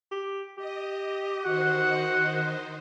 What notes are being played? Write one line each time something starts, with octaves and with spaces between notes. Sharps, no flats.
G4
G4 D#5
D#3 D#4 F#4 C5 F#5